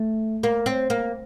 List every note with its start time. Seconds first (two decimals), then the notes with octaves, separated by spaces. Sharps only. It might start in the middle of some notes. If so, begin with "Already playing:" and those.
Already playing: A3
0.43 A#3
0.66 C4
0.90 A#3